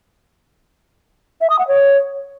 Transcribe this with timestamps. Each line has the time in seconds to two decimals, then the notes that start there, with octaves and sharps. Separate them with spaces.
1.41 E5
1.50 D#6
1.59 F#5
1.68 C#5